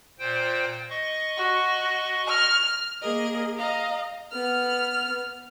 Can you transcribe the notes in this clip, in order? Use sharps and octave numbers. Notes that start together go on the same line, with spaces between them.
A#2 C5 G5
D#5 C#6
F#4
F6
A#3 G#4 A#4 D#5
D#5 F5 A#5
B3 F6